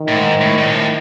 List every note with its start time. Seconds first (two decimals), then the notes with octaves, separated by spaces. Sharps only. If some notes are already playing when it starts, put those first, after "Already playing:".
Already playing: D#3
0.08 A2
0.15 G#2
0.41 A2
0.58 A#2
0.67 G#2
0.74 A2